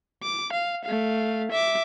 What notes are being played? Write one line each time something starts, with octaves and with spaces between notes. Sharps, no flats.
D6
F5
A3 F5
E5 D6